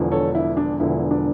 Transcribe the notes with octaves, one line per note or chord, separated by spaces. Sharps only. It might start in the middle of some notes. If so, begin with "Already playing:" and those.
Already playing: E1 E2 D3 F3
A4 C#5
E4
D4
E1 E2 D3 F3 E4
D4